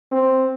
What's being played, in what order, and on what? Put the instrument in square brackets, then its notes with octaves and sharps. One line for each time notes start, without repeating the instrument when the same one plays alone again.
[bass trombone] C4